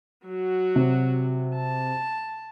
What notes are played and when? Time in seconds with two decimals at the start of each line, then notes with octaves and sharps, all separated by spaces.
0.25 F#3 F#4
0.76 C3
1.56 A5